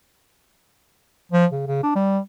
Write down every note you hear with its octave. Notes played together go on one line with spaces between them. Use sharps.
F3
C#3
C#3
D4
G3